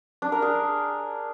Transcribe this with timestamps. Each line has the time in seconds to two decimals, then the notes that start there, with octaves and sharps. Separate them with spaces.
0.22 D4
0.32 A#4
0.42 G#4